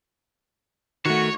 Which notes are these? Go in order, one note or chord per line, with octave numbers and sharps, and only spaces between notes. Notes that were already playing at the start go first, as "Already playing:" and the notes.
D#3 A3 F#4 C#5